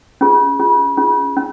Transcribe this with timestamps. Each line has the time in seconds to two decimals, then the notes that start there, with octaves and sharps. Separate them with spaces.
0.21 C#4 F4 G#4
0.59 C#4 F4 G#4
0.97 C#4 F4 G#4
1.37 C#4